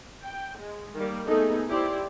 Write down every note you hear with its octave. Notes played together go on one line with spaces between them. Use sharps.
G5
G#3
D#3 G3 A#3
A3 B3 D#4 G#4 A4
E4 G4 C5 D5